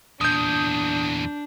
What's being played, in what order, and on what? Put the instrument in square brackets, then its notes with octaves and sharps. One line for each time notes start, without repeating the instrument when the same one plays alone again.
[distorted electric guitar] E2 A#2 [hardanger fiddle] D4 [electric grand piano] D#6 G6